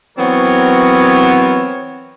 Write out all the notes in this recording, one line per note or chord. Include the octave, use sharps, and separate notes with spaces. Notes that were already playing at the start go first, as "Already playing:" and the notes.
E3 F#3 B3 C4 A#4 C#5